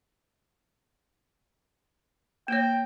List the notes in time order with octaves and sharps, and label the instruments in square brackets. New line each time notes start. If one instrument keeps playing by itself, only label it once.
[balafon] A#3 C#5 [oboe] G5